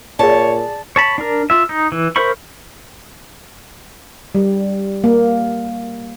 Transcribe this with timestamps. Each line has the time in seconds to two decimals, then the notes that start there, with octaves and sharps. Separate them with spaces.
0.19 A#2 G#4 C#5 D5 A5
0.96 C#5 A5 B5
1.18 D4 A#4
1.50 F4 E5
1.69 D#4
1.92 E3
2.16 A#4 C5 E5 B5 C#6
4.35 G3
5.04 A#3